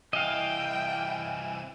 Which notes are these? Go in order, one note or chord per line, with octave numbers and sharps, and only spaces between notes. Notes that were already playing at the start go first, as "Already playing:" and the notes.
C2 E3 D#5 F5 G5